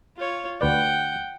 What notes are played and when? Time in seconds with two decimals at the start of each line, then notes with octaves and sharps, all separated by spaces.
0.17 F4 C#5
0.61 D2 B4 D5 F#5 G5